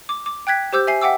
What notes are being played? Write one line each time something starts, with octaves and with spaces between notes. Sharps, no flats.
D6
D6
G5 F#6 G#6 B6
G4 C5 D6 E6 G6
E5 G#5 C7
E5 F#5 G5 D6 E6